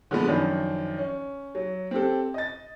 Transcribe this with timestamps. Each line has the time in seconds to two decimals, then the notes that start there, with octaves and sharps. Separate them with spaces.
0.11 D3 F3 G#3 B3
0.27 F#2 D#3 F3 D4
0.98 C#4
1.55 F#3
1.91 C4 G4 A4
2.34 D#5 A6